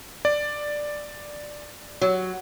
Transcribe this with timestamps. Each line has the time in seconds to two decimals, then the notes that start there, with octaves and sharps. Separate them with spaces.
0.25 D5
2.01 F#3